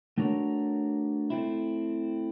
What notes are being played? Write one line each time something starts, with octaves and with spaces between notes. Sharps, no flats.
A3 D4 F#4 A#4 C#5
A3 C4 E4